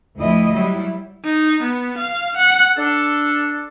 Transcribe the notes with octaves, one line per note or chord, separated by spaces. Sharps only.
D2 F3 E4 D#5
F#3 G3 E4
D#4
B3
F5
F#5
D4 A4